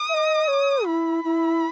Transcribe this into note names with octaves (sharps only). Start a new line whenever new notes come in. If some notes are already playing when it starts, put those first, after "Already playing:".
Already playing: D#6
E5
D#5
C#5
E4 B5
E4